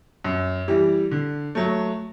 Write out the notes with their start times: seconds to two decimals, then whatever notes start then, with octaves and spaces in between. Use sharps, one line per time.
0.24 F#2
0.68 E3 G3
1.11 D3
1.55 F#3 A3